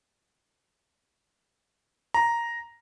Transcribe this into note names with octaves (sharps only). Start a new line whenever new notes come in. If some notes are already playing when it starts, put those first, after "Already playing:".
A#5